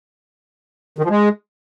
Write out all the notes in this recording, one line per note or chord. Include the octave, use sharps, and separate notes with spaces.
D#3
F3
G#3